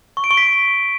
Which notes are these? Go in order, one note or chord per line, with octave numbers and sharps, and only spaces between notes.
C#6
D7
C#6
B6